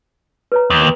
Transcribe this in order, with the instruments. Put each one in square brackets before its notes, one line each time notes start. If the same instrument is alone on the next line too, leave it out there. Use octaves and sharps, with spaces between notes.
[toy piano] B4 C#5 A#5
[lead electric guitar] D#2